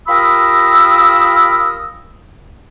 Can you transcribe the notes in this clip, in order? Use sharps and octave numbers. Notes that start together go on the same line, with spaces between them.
F4 G4 A#4 B5 D#6 E6